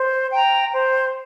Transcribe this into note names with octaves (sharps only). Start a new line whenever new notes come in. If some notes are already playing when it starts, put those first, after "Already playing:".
Already playing: C5
G5 A#5
C5